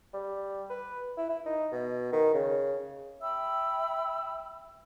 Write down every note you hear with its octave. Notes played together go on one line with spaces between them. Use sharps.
G3
B4
E4
E4
D#4
B2
D#3
C#3
E5 G5 B5 E6